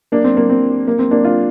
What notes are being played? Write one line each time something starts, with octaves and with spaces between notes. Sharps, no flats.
A#3 D4
C4
A#3
C4
A#3
C4
A#3 D4
D4 F4